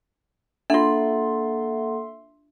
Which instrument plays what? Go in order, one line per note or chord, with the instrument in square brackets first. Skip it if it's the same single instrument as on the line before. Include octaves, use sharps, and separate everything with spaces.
[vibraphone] A#3 A4 F#5 [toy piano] D4 F4 [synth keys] E5 C6